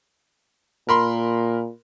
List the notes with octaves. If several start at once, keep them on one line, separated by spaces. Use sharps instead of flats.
A#2 A#4 B5 C6